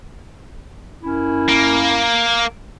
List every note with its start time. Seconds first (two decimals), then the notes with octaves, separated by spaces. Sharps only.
1.03 F#2 C#4 E4
1.49 A#3